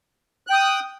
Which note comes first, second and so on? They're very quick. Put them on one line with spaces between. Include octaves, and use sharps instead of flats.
F#6 G5 D#6